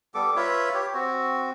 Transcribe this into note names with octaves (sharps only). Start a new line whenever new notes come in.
G3 B3 A4 D6
F4 B4 C#5 E5
G4 C#5
C4 F#4